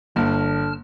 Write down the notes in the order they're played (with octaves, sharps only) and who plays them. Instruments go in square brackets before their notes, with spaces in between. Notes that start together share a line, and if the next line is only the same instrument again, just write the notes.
[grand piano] G1 [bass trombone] D3 [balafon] A#3 [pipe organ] A5 F6